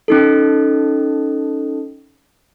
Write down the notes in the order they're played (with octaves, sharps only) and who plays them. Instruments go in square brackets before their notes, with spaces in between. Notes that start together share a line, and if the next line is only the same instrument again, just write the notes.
[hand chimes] C#4 D#4 A4